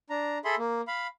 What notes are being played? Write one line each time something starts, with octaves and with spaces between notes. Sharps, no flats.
D4 A#5
G#4 A4 E5 B5 C6
A#3
F5 B5